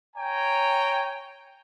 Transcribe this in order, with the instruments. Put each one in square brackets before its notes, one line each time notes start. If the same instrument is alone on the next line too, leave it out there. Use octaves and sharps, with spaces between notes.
[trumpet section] C#5 G5 G#5 A#5